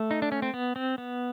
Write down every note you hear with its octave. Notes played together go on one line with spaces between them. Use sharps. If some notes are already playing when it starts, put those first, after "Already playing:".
Already playing: A3
D#4
D4
C#4
C4
B3
C4
B3